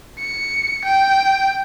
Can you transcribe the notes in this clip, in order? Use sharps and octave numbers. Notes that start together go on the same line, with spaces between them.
C#7
G5